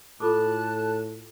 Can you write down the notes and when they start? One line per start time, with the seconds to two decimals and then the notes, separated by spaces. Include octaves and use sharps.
0.20 A2 F4 A4 A5 D6 F#6